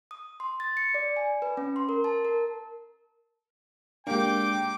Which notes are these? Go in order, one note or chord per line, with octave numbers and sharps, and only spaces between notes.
D#6
C6
A6
C#7
D5
G#5
B4
C#4
C6
A#4
A5
A#4
G#3 A#3 D4 G4 G5 D6